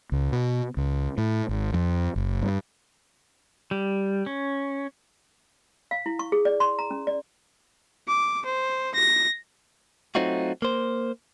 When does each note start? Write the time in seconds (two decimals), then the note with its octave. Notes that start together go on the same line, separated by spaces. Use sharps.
0.12 C#2
0.32 B2
0.77 C#2
1.18 A2
1.49 G#1
1.73 F2
2.16 F#1
2.43 G2
3.71 G3
4.26 C#4
5.91 F5
6.06 E4
6.19 C#6
6.32 G#4
6.45 D5
6.60 C6
6.79 A#5
6.91 C#4
7.07 D5
8.08 D6
8.45 C5
8.95 A#6
10.15 F#3 A3 C4 D#4 F4 F#4
10.62 A#3 C5